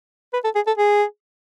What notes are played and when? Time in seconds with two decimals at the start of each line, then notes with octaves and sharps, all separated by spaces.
0.33 B4
0.44 A4
0.55 G#4
0.67 A4
0.77 G#4